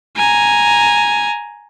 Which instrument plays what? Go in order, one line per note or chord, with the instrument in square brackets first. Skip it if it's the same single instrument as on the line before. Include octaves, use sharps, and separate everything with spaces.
[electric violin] G#5 A#5